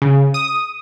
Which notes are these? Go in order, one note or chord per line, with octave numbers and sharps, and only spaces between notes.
C#3
D#6